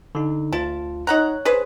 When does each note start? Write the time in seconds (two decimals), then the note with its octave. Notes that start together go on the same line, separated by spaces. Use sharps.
0.15 D3 D#4
0.52 D2 F4 A5
1.07 D#4 C#5 F#5 A#5 F#6
1.45 G#4 B4 C5